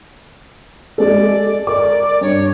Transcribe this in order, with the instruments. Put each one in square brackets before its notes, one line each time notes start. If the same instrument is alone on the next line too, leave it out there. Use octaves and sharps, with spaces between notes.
[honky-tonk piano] G#3 A4 [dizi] D5
[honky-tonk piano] A#4 D6 [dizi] D5
[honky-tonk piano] G2 [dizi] C#5